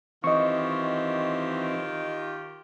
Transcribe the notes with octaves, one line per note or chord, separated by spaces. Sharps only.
D#3 E3 C4 F4 G4 D#5 C#6